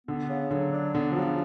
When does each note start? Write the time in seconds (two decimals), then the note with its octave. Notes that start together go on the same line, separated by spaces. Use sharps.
0.07 D3 B3
0.29 C#3
0.51 D3 F#3
0.72 D4
0.94 D3 B3
1.12 F3
1.17 C#3 F#3